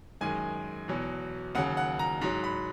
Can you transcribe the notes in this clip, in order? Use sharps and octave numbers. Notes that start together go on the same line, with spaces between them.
F#2 D#3 G#3 G#5
E2 B2 F#3
D#2 C#3 F#3 F#5
F#5
A#5
G#2 F#3 A#5
B5